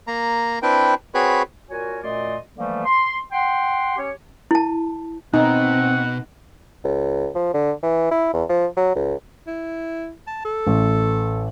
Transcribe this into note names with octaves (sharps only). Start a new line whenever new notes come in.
A#3 A#5
C4 D4 E4 B4 G5
C4 F#4 G#4 B4 C#5 B5
A#2 F#4 A#4 C#5 G#5
F#2 A#2 A3 D5 D#5 C6
D3 E3 F3 G3 A3 A#3
C6
F#5 G5 C6
C#4 G4 C#5
E4 A5
B2 C4 D#4 F#5
C#2
F3
D3
E3
E4
E2
F3
F#3
C#2
E4
A5
A4
A1